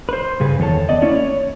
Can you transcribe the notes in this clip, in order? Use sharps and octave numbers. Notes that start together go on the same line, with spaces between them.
B4 C5
G2 C#3 G#4 B4
E2 D#3 A4 C#5 A5
B3 D5 D#5
A3 A#3 C#4 E4 C#5 D5
C#5